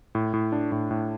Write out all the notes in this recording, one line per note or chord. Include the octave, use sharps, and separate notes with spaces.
A2
A2
D4
A2
A2